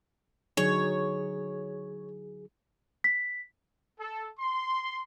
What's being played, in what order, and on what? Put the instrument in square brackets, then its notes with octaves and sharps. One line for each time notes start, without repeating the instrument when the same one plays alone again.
[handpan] D3 F#3 D#4 [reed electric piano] G#4 [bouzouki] C#5
[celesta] B6
[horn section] A4
C6